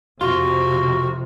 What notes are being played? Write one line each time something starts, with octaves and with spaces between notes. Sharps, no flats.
F2 C3 F4 F#4